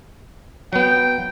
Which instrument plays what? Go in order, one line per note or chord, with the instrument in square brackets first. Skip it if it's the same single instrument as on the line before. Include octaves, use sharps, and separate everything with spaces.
[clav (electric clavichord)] F#3 B3 [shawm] G5